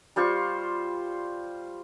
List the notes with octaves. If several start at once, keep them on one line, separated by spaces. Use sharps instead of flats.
G3 F4 C5 C#6